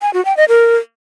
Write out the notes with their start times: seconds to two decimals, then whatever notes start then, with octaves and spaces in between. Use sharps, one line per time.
0.02 G#5
0.14 F#4
0.25 G5
0.37 D#5
0.49 A#4